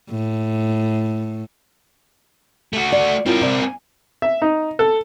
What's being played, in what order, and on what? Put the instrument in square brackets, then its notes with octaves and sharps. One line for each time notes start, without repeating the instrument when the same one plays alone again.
[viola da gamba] A2
[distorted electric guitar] A3 F#4
[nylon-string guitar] D5
[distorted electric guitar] C4 A#4 [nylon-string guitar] E4 F4 C#5
[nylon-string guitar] C3 D5
G#5
[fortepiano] E5
D#4
A4